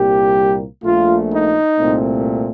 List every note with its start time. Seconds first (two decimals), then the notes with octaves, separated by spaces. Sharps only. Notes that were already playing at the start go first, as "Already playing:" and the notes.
Already playing: C2 A#2 G3 A#3 G4
0.83 A#1 A#2 A3 F4
1.30 D#4
1.77 C2 A#2 A3 C4